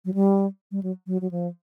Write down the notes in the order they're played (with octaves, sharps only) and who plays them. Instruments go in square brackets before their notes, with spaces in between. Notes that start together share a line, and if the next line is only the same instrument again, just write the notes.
[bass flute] F#3
G3
G3
F#3
F#3
F#3
F3